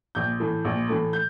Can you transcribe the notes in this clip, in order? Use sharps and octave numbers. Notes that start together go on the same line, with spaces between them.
A#1 G6
A2 E3 A3
A#1
A2 E3 A3
G6